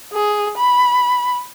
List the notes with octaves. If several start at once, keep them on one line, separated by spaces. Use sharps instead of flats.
G#4
B5